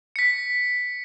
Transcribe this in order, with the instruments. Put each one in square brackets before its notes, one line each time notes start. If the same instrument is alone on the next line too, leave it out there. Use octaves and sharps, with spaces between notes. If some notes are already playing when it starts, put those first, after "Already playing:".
[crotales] B6 C#7